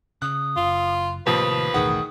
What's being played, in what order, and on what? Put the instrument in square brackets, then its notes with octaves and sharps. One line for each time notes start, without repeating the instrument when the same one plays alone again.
[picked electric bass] C#3 [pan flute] D#6 [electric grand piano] F#6
[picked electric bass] F#1 [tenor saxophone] F4
[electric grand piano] D#2 F3 [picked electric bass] A2 C3 D#3 [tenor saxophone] B4 [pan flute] D#6
[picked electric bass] B1 E2 A2 [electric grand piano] D#3 G#4 F#5 [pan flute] D#6